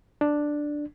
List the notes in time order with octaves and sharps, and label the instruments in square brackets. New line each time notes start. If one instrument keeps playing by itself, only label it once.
[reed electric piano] D4